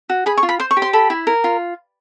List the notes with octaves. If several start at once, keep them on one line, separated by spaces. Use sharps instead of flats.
F#4
G#4 B5
C#6
F4
B5
C5 C6
C#6
G4
C6
A4 B5
E4
A#4
F4